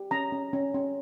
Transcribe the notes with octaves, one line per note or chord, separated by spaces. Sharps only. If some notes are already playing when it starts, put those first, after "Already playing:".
Already playing: G4
C#4 A#5
C#4
C#4
C#4